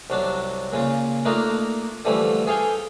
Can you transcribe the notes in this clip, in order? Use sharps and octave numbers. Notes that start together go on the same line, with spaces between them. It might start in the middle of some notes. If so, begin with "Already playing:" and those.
C2 F#3 D4 A5
A#2 C#3 F4
A3 A#3 D4 D#4 F4 A#4
D3 E3 F3 G3 A3 E4
G#4 A4 F5 G5 G#5